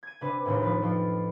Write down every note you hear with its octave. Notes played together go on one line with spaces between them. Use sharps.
G#6 D#7
C3 D4 B4
A#1 D#2 A2
F3 B4
F2 F3